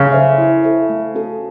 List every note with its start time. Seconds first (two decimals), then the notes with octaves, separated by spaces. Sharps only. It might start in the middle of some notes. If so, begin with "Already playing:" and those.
Already playing: C#3
0.12 A4 C5 E5
0.38 E4
0.64 A4 C5 E5
0.90 A3
1.15 C#4 F#4 A4